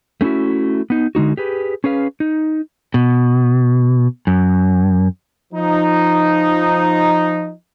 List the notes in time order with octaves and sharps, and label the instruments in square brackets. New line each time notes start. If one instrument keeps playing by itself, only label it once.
[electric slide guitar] A3 C#4 D#4 E4 F#4
B3 D#4
D3 G#3 D#4 F#4
G4 G#4 B4
C#4 G#4 B4 F5
D#4
[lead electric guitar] B2
F#2
[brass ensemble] F3 D#4